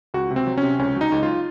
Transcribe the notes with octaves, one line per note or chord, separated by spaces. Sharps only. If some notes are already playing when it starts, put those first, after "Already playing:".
C#2 F#4
C3
C4
F#3
C#4
C3
C#2 C#4
F#3 D#4
C#2
F4